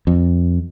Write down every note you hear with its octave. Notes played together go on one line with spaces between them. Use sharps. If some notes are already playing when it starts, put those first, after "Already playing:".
F2